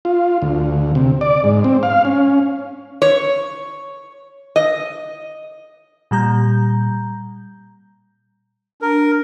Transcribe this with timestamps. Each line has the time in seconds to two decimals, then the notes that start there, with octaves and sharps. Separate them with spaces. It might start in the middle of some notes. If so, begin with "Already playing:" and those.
0.05 F4
0.42 D2
0.95 C3
1.21 D5
1.44 G#2
1.64 C4
1.83 F5
2.05 C#4
3.02 C#5
4.56 D#5
6.11 A#2 G3 A#5 G6
8.82 D4 A#4